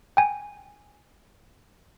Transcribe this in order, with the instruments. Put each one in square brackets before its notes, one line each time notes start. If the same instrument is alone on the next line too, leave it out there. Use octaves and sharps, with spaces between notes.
[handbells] G5 G#5